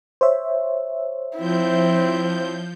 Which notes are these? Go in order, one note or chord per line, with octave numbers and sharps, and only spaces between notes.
C5 C#5 E5
F3 C4 E4 G6